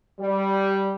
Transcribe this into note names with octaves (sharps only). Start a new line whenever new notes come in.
G3